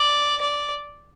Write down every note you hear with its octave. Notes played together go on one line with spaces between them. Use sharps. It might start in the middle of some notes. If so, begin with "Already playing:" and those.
Already playing: D5
D5